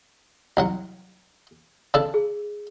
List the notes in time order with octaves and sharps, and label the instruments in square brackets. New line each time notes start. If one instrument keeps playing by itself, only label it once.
[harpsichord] C2 F#3 F#5
C#3 D4 A4
[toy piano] G#4